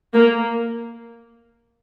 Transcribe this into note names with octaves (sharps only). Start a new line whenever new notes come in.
A#3